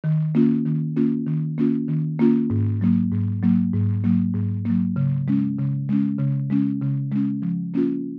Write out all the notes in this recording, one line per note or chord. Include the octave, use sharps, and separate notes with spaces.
D#3
A#3 C#4 F4
D#3
A#3 C#4 F4
D#3
A#3 C#4 F4
D#3
A#3 C#4 F4
G#2
F#3 A#3
G#2
F#3 A#3
G#2
F#3 A#3
G#2
F#3 A#3
C#3
G#3 C#4
C#3
G#3 C#4
C#3
G#3 C#4
C#3
G#3 C#4
F3
A#3 C#4 F4